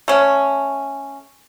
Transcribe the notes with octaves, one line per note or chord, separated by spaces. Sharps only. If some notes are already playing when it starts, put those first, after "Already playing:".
A3 C#4